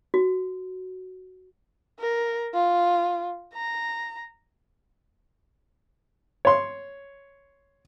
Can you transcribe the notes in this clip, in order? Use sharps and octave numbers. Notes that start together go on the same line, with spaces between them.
F#4
A#4
F4
A#5
C#5 C6